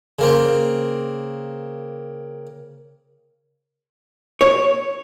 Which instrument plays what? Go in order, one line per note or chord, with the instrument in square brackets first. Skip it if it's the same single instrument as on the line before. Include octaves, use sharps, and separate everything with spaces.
[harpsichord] C#3 A#3 C4
[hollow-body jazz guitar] C#5